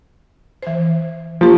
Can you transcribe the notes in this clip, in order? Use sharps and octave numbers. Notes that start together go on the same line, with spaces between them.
E3 C5
F3 A#3 G4